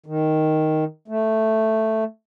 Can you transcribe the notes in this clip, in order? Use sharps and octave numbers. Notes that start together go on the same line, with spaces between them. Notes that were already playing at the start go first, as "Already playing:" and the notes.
D#3
A3